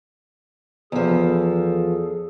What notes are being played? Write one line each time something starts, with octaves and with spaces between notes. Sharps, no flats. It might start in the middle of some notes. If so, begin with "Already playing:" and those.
E2 F3 G#4 A4